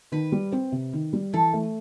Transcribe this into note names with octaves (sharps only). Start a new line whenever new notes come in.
D#3 B4
G3
C4
C3
D#3
G3
E3 A4
A3